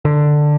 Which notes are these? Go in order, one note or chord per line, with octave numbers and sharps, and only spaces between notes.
D3